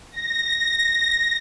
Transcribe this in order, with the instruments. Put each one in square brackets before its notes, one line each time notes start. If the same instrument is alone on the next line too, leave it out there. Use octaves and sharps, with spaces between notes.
[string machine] A#6